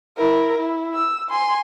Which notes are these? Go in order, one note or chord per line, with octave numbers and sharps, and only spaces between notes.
E4 A#4
E4
E6
G#5 C6